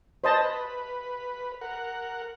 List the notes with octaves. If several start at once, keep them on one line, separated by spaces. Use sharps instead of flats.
B4 C5 D#5 A5
A#4 F#5